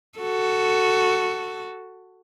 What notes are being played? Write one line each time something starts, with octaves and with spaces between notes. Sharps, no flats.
F#4 A4